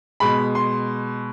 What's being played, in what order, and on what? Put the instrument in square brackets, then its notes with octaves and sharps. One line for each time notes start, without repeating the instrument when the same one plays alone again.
[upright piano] B2 G#3 B5
C6